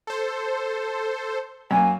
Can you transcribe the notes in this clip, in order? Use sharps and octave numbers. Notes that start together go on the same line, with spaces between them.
A4 C5
F#2 A#3 G#5